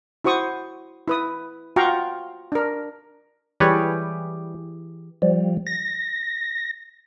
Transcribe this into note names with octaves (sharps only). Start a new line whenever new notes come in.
E4 F#4 C5 C#6 D#6
E4 B4 D#6
F4 F#4 F5 G5 A#5 C#6
D4 A#4
E3 G3 G4 G#4 B4 C#5
F3 G3
A#6